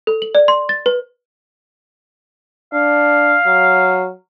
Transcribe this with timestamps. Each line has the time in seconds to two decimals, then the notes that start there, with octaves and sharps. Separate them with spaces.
0.07 A4
0.22 F#7
0.35 D5
0.48 C6
0.69 A6
0.86 B4
2.73 D4 F5
3.46 F#3